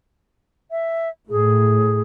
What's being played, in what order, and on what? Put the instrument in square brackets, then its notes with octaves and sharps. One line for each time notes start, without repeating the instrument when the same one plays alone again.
[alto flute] E5
[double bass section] A2 [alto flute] G#4